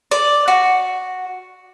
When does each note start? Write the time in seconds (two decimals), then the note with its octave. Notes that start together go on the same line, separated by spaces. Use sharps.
0.11 D5
0.48 F#4